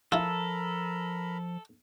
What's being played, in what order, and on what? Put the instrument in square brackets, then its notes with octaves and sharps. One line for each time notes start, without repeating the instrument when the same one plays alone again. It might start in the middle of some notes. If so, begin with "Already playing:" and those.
[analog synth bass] F3 [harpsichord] E4 F4 [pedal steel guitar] A4 [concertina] A#4 A#5 B5